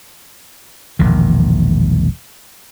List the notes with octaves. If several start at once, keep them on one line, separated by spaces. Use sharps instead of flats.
E1 A#1 D#3